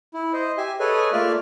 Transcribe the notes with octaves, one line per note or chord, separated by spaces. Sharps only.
E4
C5 D#5
G4 E5 G#5
G#4 A4 B4 C#5 D#5 G#5
A3 A#3 F4 D5 E5 F6